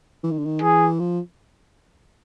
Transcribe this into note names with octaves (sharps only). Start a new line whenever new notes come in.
E3
D#3
D3
D#3
E3 G#4
F3